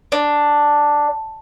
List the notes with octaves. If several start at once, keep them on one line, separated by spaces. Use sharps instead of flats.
D4